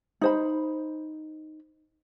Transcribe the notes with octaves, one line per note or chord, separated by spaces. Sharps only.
D#4 C5 B5